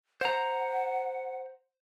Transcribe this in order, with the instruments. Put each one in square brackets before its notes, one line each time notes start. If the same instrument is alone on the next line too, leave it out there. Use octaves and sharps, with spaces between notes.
[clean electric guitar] C5 A#5 [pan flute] F#5